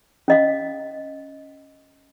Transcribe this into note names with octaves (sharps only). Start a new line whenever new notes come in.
C#4 D#5 F5